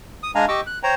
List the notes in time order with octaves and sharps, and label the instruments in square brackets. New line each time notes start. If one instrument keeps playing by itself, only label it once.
[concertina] D#6
G#3 D4 F5 G#5 A#5
G4 D#5 C#6 D6 E6
F#6
C5 C#5 G5 A#5